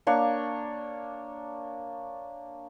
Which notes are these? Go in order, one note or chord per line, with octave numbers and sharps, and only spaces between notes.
A#3 D4 C#5 C#6